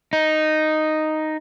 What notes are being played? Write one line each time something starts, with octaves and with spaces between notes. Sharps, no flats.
D#4